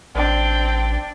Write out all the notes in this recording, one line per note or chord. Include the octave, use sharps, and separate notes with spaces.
A1 C4 D4 G5